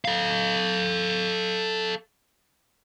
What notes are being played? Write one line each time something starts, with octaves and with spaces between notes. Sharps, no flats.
A4 F5